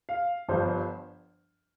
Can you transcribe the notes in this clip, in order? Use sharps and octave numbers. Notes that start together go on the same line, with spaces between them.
F5
G1 G2 F3 C5